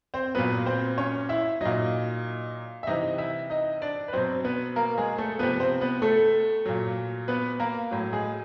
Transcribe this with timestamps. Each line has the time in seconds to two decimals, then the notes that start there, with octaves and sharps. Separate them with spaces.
0.14 C4 C5
0.35 A#2 F#3 B3 B4
0.66 C4 C5
0.98 C#4 C#5
1.29 E4 E5
1.61 A#2 F#3 D#4 D#5
2.83 E5
2.87 C3 E3 D#4 D#5
3.18 E4 E5
3.50 D#4 D#5
3.82 D4 D5
4.08 B4
4.13 B2 F#3 C4 C5
4.44 B3 B4
4.76 A#3 A#4
4.98 G#3 G#4
5.18 A3 A4
5.39 C3 F3 B3 B4
5.60 C4 C5
5.81 B3 B4
6.02 A3 A4
6.65 A#2 F#3
7.28 B3 B4
7.60 A#3 A#4
7.91 A2 F#3
8.13 G#3 G#4